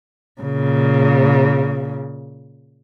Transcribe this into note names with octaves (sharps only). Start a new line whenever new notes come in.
A#2 C#3